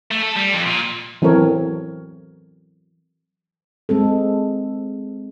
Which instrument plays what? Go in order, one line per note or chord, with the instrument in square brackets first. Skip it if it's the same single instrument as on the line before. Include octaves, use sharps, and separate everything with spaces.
[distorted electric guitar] A3
A4
G3
F2
A#2
[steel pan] E3 F#3 C4 A4 A#4 C#5
[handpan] G#3 C4 A4